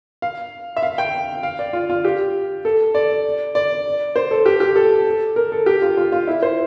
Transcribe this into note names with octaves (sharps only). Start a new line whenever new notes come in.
F5
E5
F5
G5
F5
D5
F4
F4
G4
A4
D5
D5
C5
A4
G4
G4
A4
A#4
A4
G4
F4
F4
F4
E4
C5